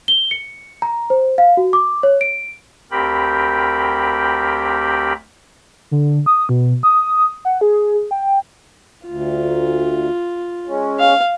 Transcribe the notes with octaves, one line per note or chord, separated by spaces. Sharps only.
G7
C#7
A#5
C5
F5
F#4
D6
C#5
D7
D2 C4 G4 A#4 G5 B5
D3
D#6
B2
D#6
F#5
G#4
G5
D2 F4
G#3 C#4
F5